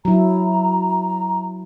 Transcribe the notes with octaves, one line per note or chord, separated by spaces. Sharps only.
F#3 E4 A#5